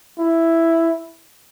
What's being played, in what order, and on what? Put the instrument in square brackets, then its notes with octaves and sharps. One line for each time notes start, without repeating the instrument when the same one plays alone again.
[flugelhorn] E4